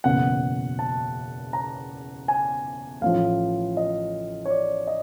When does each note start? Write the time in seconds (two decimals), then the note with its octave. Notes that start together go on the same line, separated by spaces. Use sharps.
0.04 F#1 E2 B2 F#5
0.79 A5
1.53 A#5
2.28 G#5
3.02 A1 A2 F3 F5
3.77 D#5
4.45 C#5
4.50 D5
4.87 D#5